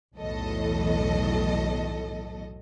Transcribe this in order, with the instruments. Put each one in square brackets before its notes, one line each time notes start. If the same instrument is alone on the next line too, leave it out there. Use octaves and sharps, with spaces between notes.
[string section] B1 E2 A2 F#3 A4 D#5